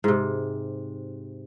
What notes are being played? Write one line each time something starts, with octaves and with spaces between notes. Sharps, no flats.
G#2 C3